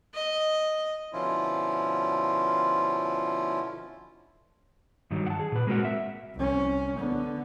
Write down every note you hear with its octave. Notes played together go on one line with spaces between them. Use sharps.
D#5
B2 D3 F3 C#4 E4 F4
G2 D#3 F#3
F#5 A5
G#4
A#2 B4
G#3 A#3 C4 F#4 A#4 F#5
E5
C2 C#4
D3 B3